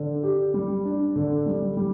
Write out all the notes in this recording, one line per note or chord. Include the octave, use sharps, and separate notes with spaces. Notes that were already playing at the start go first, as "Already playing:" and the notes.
Already playing: D3
G4
G3
D4
D3
G3
G3